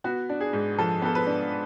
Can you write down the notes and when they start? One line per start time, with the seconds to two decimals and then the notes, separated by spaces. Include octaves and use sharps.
0.04 B3 F#4
0.29 D4
0.41 G#4
0.53 G#2
0.78 F3 A4
1.02 B3 A4
1.15 B4
1.26 D4